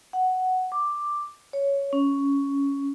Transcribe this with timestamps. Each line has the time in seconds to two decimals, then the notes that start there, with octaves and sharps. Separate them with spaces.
0.13 F#5
0.72 D6
1.53 C#5
1.93 C#4